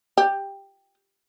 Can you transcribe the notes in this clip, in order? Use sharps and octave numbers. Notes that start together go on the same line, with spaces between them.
G4